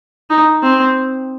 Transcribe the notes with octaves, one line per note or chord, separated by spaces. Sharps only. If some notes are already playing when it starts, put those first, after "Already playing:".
D#4
C4